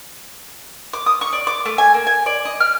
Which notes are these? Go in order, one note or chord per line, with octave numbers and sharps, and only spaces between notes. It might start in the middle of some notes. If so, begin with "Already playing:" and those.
D6
D#6
C#6
D5
D6
A3
G#5
A#3
G#5
D5
D#5
F6